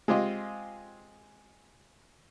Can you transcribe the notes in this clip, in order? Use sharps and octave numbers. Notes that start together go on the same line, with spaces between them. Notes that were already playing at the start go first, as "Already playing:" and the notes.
G#3 C4 F4 G4 D#5